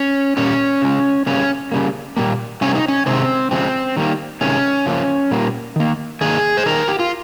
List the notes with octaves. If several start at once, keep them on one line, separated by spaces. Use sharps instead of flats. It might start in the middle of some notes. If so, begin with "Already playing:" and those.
Already playing: C#4
A#2 G3 A#3 C#4
C#3 G#3
C#3 G3 A#3 C#4
C#3 G3 A#3
A#2 G3 A#3
C3 G3 A#3 C#4
D#4
C#4
C3 D#3 G#3 C4
C#3 F3 G#3 C4
D#3 G3 A#3
C3 D#3 G#3 C#4
C#3 F3 A#3
A#2 G3 A#3
D#3 A#3
D#3 A#3 G#4
C5
D#3 G3 A#3 A#4
G4
F4